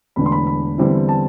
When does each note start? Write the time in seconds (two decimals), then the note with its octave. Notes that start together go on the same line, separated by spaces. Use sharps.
0.16 E1 E2 D3 A3 D4 B5
0.26 C6
0.32 B5
0.47 B5
0.78 E2 D3 G3 C4 E4
1.09 A5